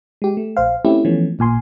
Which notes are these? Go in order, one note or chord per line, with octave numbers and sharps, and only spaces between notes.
G#3 G4
A3
A#1 C5 F5
A3 C4 C#4 E4 G4
E3 F3 A3 B3 C#4
A1 A#2 G#5 C6